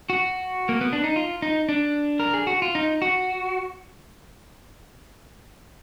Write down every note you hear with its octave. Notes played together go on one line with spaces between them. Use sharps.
F#4
A#3
B3
D4
D#4
F4
D#4
D4
A#4
G#4
F#4
F4
D#4
F#4